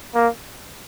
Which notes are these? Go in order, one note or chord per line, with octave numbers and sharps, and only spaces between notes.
A#3